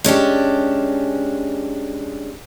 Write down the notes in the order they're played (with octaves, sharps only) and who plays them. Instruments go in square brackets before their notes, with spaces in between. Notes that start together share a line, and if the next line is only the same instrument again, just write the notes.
[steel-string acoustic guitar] G#3 C#4 D4 G4